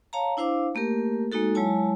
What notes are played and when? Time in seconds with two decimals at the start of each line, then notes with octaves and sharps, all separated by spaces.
0.13 C#5 F5 A5 A#5
0.37 D4 E4 C5 F5 D6
0.75 A3 A#3 G4 A#4
1.32 G#3 A#3 D#4 F#4 A4
1.55 F#3 G#3 E4 C#5 G#5 A5